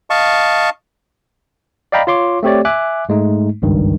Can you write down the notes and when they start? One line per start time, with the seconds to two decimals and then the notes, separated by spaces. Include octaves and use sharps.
0.10 D#5 F5 A5 C#6
1.92 D5 D#5 F5 G5 A#5 B5
2.07 F4 C#5 C6 D6
2.43 A3 C4 G4 C#5 D5
2.65 E5 G#5 D6 F#6
3.09 G#2 G#3 A3 D#4
3.62 G#1 C#2 G2 D#3